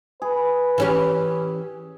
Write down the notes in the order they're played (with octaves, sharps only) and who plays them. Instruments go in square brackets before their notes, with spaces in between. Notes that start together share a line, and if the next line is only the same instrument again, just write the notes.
[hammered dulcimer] G#4 [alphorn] B4
[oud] E3 C#4 G4